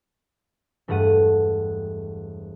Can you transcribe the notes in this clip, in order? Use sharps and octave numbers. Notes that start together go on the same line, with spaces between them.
E1 G2 A3 F#5 D#7